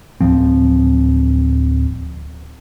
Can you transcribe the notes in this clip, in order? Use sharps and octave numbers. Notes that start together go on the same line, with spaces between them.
D1 F3 C4